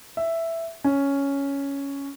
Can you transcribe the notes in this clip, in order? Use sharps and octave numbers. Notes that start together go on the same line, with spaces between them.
E5
C#4